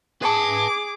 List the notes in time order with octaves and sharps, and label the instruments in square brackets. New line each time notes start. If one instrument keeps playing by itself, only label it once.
[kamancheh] G#4 D6 [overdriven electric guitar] B4 A5